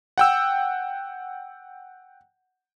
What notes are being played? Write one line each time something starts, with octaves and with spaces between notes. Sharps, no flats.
F#5 G5 E6